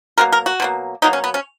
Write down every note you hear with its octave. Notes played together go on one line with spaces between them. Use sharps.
B2 F#3 A#3 A#4
A#4
F#4
B2 F#3 A#3
B2 F#3 A#3 D#4
C#4
B3
C#4